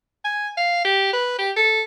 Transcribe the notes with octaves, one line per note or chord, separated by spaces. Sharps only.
G#5
F5
G4
B4
G4
A4